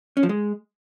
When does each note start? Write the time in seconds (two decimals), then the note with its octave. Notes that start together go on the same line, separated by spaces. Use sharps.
0.17 C#4
0.23 F3
0.29 G#3